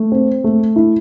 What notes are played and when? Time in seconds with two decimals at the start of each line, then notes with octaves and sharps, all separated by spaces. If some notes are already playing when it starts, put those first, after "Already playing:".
Already playing: A3
0.12 C4
0.44 A3
0.76 E4